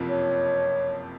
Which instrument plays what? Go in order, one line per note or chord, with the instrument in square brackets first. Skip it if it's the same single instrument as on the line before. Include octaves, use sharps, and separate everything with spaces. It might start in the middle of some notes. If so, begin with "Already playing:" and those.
Already playing: [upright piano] F#1 F2 C3 F3
[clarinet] C#5